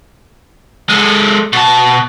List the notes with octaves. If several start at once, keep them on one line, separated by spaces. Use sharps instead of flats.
G#3 A4
B2 A5